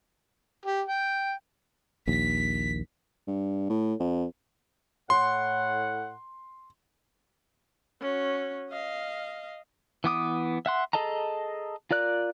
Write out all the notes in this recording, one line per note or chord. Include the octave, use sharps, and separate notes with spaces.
G4
G5
A#1 D#2 B6
G2
A2
F2
A2 F#5 C6
C#4 F#4
D#5 F5
E3 B3 D6 D#6
E5 F#5 C6
G#4 A4 D#5 A5 A#5
F4 A#4 D5 F#6